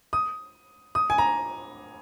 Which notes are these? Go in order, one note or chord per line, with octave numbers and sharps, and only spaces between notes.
D#6
D#6
G#5
A#5